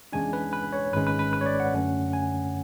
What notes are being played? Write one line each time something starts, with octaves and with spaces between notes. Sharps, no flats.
E2 C#3 G#3 D4 G#5
B4
B4
C#5
G#1 G#2 G#3 C#4 B4
B4
B4
B4
C#5
D5
F#5
F#2 D3 A3 C#4
G#5